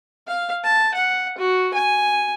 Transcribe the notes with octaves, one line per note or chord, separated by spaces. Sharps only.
F5
A5
F#5
F#4
G#5